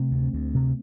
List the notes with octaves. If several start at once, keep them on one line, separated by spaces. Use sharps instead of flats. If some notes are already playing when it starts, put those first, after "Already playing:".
Already playing: C3 A3 C4
D2
D2
C3